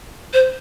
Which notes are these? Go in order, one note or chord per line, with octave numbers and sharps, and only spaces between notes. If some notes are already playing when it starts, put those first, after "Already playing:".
C5